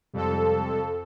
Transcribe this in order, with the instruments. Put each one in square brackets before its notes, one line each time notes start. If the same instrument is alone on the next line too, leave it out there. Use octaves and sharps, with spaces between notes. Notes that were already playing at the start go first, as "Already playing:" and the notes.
[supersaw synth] F2 A4 [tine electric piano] C3 G3 G#3